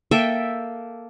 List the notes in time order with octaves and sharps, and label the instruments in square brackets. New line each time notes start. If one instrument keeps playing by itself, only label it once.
[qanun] A#3 A4 E5 G5